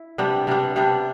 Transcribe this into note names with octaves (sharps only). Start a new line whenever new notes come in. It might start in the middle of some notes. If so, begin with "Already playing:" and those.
Already playing: E4
C3 G3 B3 D4
C3 G3 B3 D4
C3 G3 B3 D4